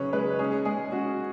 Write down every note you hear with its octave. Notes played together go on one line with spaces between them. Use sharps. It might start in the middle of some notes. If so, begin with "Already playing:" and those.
Already playing: C#3 F#3 C#4 B4 C#5
G#3 B4
C#4 G#4
G#3 G#4
C#4 F#4